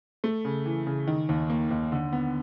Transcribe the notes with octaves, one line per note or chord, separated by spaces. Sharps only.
A3
C#3
E3
C#3
D#3
D#2
A#3
D#2
D3
B3